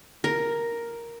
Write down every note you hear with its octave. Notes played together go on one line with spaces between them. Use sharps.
A#4